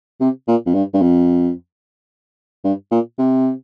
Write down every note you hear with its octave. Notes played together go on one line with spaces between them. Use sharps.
C3
A#2
F2
G2
G2
F2
G2
A#2
C3